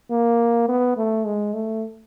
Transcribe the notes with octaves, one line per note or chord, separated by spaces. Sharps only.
A#3
B3
A3
G#3
A3